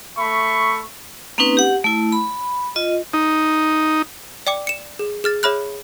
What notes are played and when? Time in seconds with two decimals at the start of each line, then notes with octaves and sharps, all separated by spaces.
0.18 A3 E5 B5 C#6
1.38 A#3 C4 C#4 D#4 B4
1.57 G4 F#5
1.84 A3 E4
2.12 B5
2.76 F4 D#5
3.14 D#4
4.47 D5 G5 D6 C#7
4.67 C#7 E7
4.99 G#4
5.24 G#4 F6 A6
5.43 G#4 C#5 E5 B5 F6 F#6